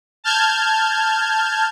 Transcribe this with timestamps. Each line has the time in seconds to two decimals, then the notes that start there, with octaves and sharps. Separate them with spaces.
0.24 A5 F6 G6 G#6